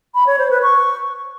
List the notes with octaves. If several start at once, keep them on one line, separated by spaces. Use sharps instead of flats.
B5
C#5
C5
B4
C#6